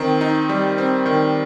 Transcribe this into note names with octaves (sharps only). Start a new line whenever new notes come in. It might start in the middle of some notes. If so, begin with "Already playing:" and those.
Already playing: D#3 C4
D#4
G3
C4
D#3